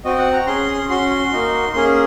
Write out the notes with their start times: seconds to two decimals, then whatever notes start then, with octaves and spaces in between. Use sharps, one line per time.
0.04 C4 F#4 D#5
0.18 F#5
0.33 A#5
0.46 C#4 G#4 C6
0.89 C#4 F#4 C6
1.11 C6
1.32 A#3 D#4 F#4
1.73 A#3 C#4 G#4 C6